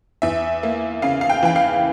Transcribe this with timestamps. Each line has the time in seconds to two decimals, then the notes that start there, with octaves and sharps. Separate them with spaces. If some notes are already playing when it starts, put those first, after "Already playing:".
0.22 E2 E5
0.63 A#3
1.02 C#3 F5
1.21 F5
1.30 G5
1.43 E3 G5
1.56 F5